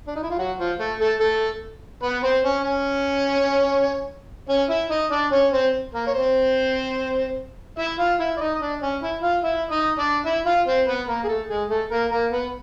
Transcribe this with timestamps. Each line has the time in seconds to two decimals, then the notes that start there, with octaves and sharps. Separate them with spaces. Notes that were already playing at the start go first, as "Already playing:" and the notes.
0.07 D4
0.15 D#4
0.23 E4
0.31 F4
0.38 F#3 F#4
0.59 F3 F4
0.79 A3 A4
1.00 A3 A4
1.20 A3 A4
2.03 B3 B4
2.23 C4 C5
2.45 C#4 C#5
2.64 C#4 C#5
4.49 C#4 C#5
4.70 E4 E5
4.90 D#4 D#5
5.11 D4 D5
5.32 C#4 C#5
5.53 C4 C5
5.93 A#3 A#4
6.07 C#5
6.14 C4 C5
7.79 E4 E5
7.99 F4 F5
8.20 E4 E5
8.37 D5
8.41 D#4 D#5
8.55 D#5
8.61 D4 D5
8.82 C#4 C#5
9.02 E4 E5
9.23 F4 F5
9.44 E4 E5
9.71 D#4 D#5
9.99 D4 D5
10.25 E4 E5
10.46 F4 F5
10.67 C4 C5
10.87 B3 B4
11.08 A#3 A#4
11.24 G#4
11.29 A3 A4
11.49 G#3 G#4
11.70 A3 A4
11.91 A#3 A#4
12.11 A#3 A#4
12.31 B3 B4